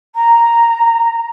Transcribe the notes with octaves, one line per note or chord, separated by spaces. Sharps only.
A#5